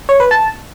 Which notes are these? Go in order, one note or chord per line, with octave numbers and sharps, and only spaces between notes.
C#5
B4
A5